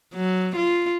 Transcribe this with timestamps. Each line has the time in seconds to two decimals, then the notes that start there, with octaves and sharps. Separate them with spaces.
0.14 F#3
0.56 F4